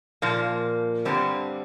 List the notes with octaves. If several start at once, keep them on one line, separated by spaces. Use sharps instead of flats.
A#2 F3 A#3
G2 D3 G3 C4